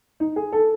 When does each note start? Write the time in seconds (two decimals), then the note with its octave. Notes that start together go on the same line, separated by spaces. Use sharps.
0.20 D#4
0.36 G#4
0.52 A4